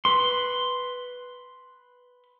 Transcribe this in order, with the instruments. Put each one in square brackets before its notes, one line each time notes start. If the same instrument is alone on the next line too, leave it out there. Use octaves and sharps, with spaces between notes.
[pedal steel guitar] B4 C6